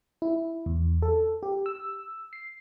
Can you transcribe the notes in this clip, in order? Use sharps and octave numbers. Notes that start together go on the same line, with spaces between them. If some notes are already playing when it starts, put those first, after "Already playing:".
E4
E2
A4
G4
E6
C7